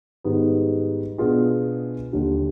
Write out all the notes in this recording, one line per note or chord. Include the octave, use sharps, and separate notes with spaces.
G#2 D#3 G3 B3
B2 B3 D4 F4 G#4
D#2 D3 G3